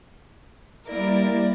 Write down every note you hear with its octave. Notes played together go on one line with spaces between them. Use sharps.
G3 A#3 E4 A#4 D5